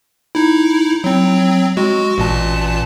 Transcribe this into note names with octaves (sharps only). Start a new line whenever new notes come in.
D#4 E4
F#3 C4
G#3 F#4
A1 A#2 A5